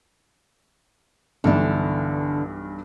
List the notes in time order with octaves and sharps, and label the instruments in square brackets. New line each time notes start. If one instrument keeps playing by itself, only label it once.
[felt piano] B1 G2 E3 [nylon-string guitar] D3 D4